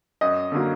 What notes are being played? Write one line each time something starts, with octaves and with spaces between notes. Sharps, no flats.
F#2 D#5
D3 F#3 A#3